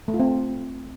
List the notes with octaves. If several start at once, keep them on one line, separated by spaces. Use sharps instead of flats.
A3
F4
C4